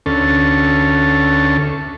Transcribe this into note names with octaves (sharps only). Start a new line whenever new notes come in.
D2 C#4 A4